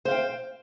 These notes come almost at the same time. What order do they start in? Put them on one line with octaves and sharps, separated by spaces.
C5 F5 G5